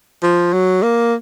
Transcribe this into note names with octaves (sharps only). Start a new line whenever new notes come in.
F3
F#3
A#3